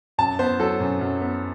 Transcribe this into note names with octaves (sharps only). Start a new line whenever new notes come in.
F#2 A5
B3 C5
F#3 A4
F#2
F#2
B3